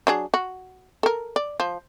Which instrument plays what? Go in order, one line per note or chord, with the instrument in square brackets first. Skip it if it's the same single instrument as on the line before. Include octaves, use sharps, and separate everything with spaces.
[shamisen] F#3 D4 G#4
F#4
A4 A#4
D5
F3